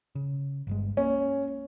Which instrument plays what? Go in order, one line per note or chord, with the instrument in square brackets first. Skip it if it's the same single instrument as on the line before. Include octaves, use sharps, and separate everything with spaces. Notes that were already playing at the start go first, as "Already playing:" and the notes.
[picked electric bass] C#3
G1 G2 G#3
[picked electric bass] A#3 [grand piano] C#4